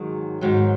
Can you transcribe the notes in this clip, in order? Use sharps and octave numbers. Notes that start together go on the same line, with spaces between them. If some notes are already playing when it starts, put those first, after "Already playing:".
Already playing: G#2 D#3 F#3 G#4
G#2 D#3 F#3